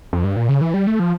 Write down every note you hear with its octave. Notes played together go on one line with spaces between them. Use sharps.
F2
G2
A#2
C#3
E3
G3
A3
F3